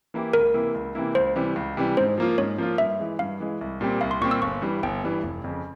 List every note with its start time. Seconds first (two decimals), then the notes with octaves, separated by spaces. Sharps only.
0.14 E3 A#3 E4 G4
0.33 C#2 A#4
0.54 C3 E3 A#3 E4
0.75 C#2
0.95 C3 E3 A#3 E4
1.15 C#2 C5
1.36 C3 E3 G3
1.56 C#2
1.77 C3 E3 G3
1.97 G#2 C5
2.18 F3 A#3 F4
2.38 G#2 C#5
2.58 F3 A#3 F4
2.78 G2 E5
2.99 E3 G#3
3.19 G2 F5
3.40 E3 G#3
3.61 C2
3.81 A#2 G3 C4 G4
4.01 C2 F5
4.11 C6
4.21 A#2 G3 C4 G4 C#6
4.31 E6
4.42 G1 C#6
4.62 G2 E3 G3
4.83 G1 G5
5.04 G2 E3 G3
5.23 F1
5.44 F2 C#3